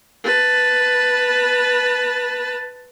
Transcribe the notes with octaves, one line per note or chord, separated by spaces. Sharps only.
B4 A5